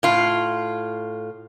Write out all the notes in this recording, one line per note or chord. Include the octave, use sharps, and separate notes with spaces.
A2 F4